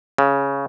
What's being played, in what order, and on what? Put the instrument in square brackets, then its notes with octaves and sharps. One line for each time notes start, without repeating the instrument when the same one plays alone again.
[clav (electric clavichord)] C#3